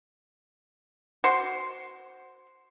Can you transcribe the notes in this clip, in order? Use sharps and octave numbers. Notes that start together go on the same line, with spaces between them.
F#4 C5 C6